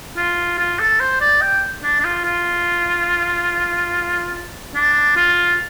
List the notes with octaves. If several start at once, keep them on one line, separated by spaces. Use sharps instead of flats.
F4
F4
A4
C5
D5
G5
D4
D4
F4
F4
D4
F4